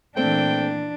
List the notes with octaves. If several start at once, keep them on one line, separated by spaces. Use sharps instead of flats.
A#2 E3 A3 C4 D4 G5